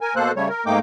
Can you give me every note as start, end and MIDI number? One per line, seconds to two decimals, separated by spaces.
0.01 0.14 70
0.01 0.14 80
0.16 0.32 47
0.16 0.32 58
0.16 0.32 69
0.16 0.32 72
0.16 0.32 90
0.36 0.48 49
0.36 0.48 55
0.36 0.48 57
0.36 0.48 73
0.49 0.64 70
0.66 0.79 44
0.66 0.79 57
0.66 0.79 58
0.66 0.79 63
0.66 0.79 79
0.66 0.79 86